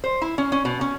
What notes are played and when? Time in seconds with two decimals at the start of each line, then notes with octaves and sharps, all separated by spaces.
0.04 C5
0.22 E4
0.38 C#4
0.52 C#4
0.65 B2
0.81 C#4